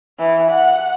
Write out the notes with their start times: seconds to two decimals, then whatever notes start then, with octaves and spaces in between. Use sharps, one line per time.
0.19 E3
0.51 F#5